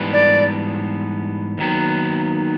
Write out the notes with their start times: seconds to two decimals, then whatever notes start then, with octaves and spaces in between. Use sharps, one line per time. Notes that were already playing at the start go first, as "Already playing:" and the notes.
Already playing: G#2 E3 G3 B3 D4
0.13 D5
1.58 D#2 D#3 F#3 B3